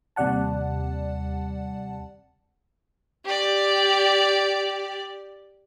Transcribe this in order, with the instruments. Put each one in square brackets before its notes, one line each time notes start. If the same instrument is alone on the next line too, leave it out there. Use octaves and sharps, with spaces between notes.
[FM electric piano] D#2 C3 G3 D5 F#5 A5
[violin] G4 D5